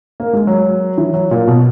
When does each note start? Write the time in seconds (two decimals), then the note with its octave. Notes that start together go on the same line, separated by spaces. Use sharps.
0.20 A#3
0.33 G#3
0.47 F#3
0.98 E3
1.14 F#3
1.31 A#2
1.47 B2